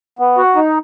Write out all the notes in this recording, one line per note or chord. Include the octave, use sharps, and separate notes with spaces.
B3
F#4
D#4